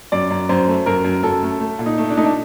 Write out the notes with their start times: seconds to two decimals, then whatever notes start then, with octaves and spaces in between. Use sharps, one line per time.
0.12 F#2 D5
0.31 F#2
0.49 F#2 C5
0.68 A3
0.86 F#2 A#4
1.04 F#2
1.23 F#2 A4
1.43 A3
1.60 A3
1.79 A#2
1.86 D#4
1.98 A3
2.10 D4
2.17 A3 D#4
2.24 D4